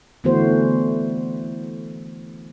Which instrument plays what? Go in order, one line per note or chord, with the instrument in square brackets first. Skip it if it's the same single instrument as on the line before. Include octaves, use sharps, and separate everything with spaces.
[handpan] D3 E3 A3 B3 F#4 C5